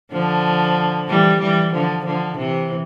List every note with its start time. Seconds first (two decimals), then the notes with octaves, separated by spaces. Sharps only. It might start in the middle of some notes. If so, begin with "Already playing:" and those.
0.12 D3 F3
1.08 E3 G3
1.41 E3 G3
1.73 D3 F3
2.05 D3 F3
2.38 C3 E3